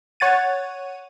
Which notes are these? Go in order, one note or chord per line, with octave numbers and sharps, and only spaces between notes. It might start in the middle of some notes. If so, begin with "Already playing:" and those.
C#5 F#5 A6 D#7